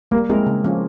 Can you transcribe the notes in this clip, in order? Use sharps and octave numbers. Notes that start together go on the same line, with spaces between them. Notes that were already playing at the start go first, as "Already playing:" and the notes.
G3 A#3
G#3 C4 E4 A#4
C#3
F3 A#3 C#4